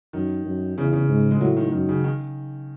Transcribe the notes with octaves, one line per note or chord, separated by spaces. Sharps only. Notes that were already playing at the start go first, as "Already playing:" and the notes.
F#2 D#3
F#2
E2 C#3
C#3
G#2
G#3
A2 F#3
D#3
F#2 D#3
C#3
D#3